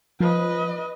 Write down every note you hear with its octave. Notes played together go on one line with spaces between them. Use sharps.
F3 B4 D#5